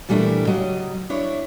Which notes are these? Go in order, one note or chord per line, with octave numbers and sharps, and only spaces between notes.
A#2 E3 G3 A3 D4 E4
C#3 F#3 G3 D#5
D4 E4 C#5